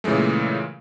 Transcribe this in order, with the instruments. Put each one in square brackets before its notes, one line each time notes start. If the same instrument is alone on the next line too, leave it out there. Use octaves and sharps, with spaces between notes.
[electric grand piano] A#2 C#3 E3 G#3 A3